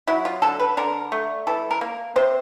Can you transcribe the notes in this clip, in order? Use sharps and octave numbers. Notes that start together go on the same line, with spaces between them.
F#3 E4
F4
D3 A4
B4
D3 A#4
A3
E3 A4
A#4
A#3
C3 C5